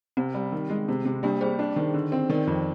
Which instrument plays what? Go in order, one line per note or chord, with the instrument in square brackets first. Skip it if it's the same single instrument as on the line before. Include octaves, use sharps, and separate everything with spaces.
[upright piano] C3 [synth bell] C4
[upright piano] G3
D#3
G#3
C3
C3
[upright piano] G3 [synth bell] A#3 D4
[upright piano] G3 [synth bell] G#4 C5
[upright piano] D4
D#3
D3
C4
[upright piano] D#3 [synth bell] A#4 D5
[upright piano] F2